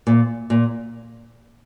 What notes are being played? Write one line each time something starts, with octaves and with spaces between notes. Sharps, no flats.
A#2
A#2